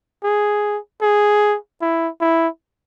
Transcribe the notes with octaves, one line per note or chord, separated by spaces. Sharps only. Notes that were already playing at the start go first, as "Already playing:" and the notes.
G#4
G#4
E4
E4